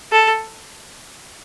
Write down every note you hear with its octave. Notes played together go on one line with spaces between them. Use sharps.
A4